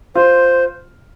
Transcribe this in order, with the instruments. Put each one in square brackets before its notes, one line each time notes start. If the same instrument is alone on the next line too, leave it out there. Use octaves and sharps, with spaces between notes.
[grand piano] F4 [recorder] C5